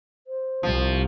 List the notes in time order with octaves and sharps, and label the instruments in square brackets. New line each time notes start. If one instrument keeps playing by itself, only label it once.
[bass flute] C5
[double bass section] C2 [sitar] F3